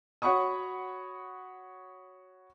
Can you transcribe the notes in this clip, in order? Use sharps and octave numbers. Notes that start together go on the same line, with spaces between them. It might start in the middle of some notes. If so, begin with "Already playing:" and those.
F#4 C#5 F#5 B5 C#6 D#6